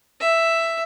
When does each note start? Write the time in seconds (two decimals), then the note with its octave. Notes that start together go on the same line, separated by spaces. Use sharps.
0.20 E5